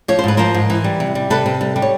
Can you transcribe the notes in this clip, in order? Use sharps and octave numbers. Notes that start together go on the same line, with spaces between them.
F3 C#5
C5
G#2 B4
F3 A#4 C5
G#2
E3
G3
C3
G3
C3 A4 B4
C3
G3
G3
C#5